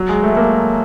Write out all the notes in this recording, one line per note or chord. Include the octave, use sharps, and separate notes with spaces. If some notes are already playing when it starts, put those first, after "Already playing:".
Already playing: F#3
G#3
A3
A3
A#3